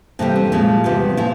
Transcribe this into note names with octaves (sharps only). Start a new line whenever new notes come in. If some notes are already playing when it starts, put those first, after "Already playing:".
F2 C3 E3 G3 A#3
C4
A#2 F3 G#3 C#4
E2 C3 G3 F4
A#2 F3 E4